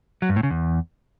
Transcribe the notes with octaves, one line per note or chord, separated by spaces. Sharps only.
F#3
G2
A2
C#3
E2